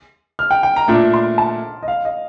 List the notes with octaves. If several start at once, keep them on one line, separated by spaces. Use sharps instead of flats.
F6
G5
G5
A#5
A#2 A3 D4 D6
C6
A5
D#5
F5
D#5